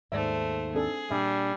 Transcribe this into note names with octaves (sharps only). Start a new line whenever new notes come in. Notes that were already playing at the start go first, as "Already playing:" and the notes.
D#2 G#2 A3 C5 D5 E5
C4 D4 G#4 A4
A#2 G3 D4 E5 G#5